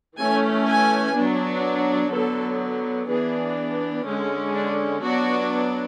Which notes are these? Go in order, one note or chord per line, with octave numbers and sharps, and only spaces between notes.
E3 A3 C#4 G#5
G#5
F#3 B3 D4
D3 F#3 B3 A4
E3 B3 D4 G#4
D3 G#3 C#4
D4
F#3 B3 D4 F#4